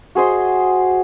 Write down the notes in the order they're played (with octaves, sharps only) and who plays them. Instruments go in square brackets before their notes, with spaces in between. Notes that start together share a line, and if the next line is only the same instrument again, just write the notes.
[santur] F#4 G#4 C5 D#5